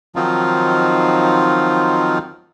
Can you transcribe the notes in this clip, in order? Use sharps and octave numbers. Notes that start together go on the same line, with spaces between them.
D#3 F3 F#3 C4 D#4 F4